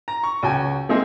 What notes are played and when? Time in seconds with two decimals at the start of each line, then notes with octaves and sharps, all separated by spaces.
0.08 A#5
0.23 C#6
0.43 C#2 F#4 G5 G#5
0.89 G#3 A#3 C4 D#4 G#4 E5